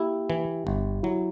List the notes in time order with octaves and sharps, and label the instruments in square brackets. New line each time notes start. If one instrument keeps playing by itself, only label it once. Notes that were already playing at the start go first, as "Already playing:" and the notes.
Already playing: [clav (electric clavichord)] A#3 E4 [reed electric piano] G4
[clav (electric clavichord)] E3
G1
[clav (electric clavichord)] F#3 [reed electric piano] E4